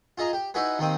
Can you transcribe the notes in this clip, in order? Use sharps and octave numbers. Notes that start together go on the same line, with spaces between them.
F4 G#4 D#5 A#5
G4
D#4 E4 F#4 G#4 B4
D#2 D#3 A#3 C4 D#6